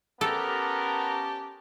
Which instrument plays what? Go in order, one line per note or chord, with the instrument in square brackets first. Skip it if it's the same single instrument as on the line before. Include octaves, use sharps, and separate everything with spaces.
[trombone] B3 [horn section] C#4 G4 A5 [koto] A4 [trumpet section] A#4